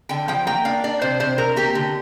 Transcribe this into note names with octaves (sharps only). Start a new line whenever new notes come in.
D3 G5
F3 G5
A#3 G5
D4 F5
D4 D5
C3 C5
C3 C5
C3 A#4
A#3 G4
D3